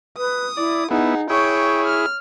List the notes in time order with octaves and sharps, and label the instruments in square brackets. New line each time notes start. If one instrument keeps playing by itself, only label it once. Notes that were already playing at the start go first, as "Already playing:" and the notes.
[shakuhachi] B4 [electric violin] D#6
[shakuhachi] E4 [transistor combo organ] D5
[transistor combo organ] B3 E4 [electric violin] D#4 G#4 [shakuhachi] F#5
[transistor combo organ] E4 G#4 [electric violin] C#5 G5 [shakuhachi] C#6
[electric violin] F6